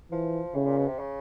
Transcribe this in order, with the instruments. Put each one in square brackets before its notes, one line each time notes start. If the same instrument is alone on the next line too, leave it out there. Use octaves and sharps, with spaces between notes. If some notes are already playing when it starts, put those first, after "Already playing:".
[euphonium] E3 [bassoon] F3
[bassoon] A2 [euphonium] C#3
[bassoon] A#2
B2
C3
C#3